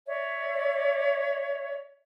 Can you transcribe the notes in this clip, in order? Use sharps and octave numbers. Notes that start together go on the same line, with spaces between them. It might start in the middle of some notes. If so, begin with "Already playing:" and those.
C#5 D5 E5